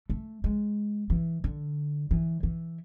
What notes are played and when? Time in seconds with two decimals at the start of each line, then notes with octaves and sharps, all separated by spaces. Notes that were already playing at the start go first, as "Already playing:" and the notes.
0.10 A3
0.44 G#3
1.10 E3
1.44 D3
2.11 E3
2.43 E3